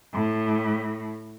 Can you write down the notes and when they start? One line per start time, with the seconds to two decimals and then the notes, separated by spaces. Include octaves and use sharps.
0.13 A2